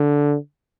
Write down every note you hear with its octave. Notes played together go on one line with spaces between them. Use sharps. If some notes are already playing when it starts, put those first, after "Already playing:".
Already playing: D3